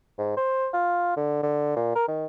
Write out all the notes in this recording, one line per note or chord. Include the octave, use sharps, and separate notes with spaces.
G#2
C5
F4
D3
D3
A#2
A#4
D#3